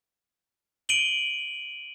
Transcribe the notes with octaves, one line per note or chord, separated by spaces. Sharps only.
D7 D#7 F#7 G7